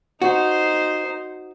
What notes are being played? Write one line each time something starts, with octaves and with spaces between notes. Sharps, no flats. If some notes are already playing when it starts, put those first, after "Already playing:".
D#4 F#4 C5